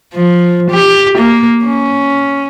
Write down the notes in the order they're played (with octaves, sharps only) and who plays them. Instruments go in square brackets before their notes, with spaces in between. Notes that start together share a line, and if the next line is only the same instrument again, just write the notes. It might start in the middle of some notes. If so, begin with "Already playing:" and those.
[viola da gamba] F3
G4
A#3
C#4